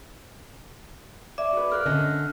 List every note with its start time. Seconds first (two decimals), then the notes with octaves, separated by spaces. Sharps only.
1.38 D5 E5 D6
1.53 F#4 B4
1.72 A#4 F5 F6 F#6
1.86 D3 C#4 D#5